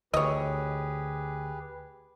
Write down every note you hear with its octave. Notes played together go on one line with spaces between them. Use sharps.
D2 G4 G#4 B4 C#5 D#5